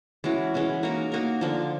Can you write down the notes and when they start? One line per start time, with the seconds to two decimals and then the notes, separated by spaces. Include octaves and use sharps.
0.24 E3 G#3 C#4 F#4
0.54 E3 G#3 C#4 F#4
0.83 A#3 D#4 F#4 A#4
1.12 A#3 D#4 F#4 A#4
1.41 D3 F3 A#3